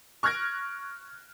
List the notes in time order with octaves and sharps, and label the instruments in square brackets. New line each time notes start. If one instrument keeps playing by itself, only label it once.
[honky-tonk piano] C#6 F6 F#6 G#6 A#6 D7